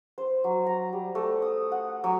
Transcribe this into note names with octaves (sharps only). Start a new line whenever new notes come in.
C5
F#3
A#5
G3
A3
D#6
F#5
F#3